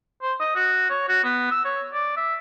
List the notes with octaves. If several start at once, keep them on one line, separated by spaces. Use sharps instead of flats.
C5
D#5
F#4
C#5
F#4
B3
E6
C#5
D5
E5